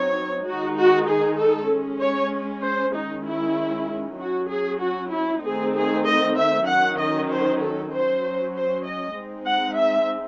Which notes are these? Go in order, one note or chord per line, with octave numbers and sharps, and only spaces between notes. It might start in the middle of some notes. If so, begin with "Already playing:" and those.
Already playing: F#3 C4 D#4 C#5
D#3 G#3 D#4 F#4
F#4
G#4
A4
G#3 C#4
C#5
C5
D#3 G#3 C#4 D#4
E4
F#3 C#4 F#4
G#4
F#4
E4
D#3 A3 C4 D#4 G#4
G#4
D#5
E5
D#3 F#3 C#4 F#5
D#5
C5
A4
F#3 C#4 C5
C5
D#5
G#3 C4 D#4
F#5
E5